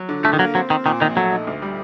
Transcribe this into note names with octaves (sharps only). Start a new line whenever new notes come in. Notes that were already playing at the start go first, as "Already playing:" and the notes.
Already playing: F#3
D3
D3 A3
D#3
F#3 A#3
F#3 C4
D#3 C4
A#2 D#3
A#1 D#3
F#3 A3
D#4
D2
G3